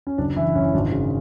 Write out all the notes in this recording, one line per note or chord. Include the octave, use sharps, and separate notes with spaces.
C#4
F#1 D4
E3 E4
F#1 C#4
G#1 D4
C#3